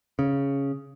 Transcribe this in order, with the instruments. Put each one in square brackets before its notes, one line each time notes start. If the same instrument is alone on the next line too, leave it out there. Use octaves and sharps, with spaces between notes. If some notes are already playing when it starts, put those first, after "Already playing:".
[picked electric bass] C#3